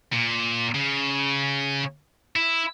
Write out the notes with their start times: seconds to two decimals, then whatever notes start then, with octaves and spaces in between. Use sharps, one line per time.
0.12 A#2
0.74 C#3
2.36 E4